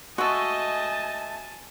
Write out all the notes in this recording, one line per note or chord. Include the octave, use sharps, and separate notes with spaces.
G#3 A3 F#4 D#5 G#5 A5